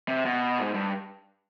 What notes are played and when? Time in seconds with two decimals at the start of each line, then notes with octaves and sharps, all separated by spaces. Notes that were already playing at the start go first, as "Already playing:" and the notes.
0.08 C3
0.25 B2
0.58 G#2
0.74 G2